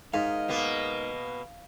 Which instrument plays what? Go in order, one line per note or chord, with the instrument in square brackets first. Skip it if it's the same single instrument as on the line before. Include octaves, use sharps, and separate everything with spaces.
[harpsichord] G#2 [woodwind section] G#4 A#4 D#5 [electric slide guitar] F5
[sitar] B2 A#3 B3